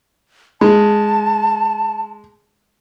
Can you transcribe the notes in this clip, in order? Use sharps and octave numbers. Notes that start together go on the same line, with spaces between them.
G#3 A5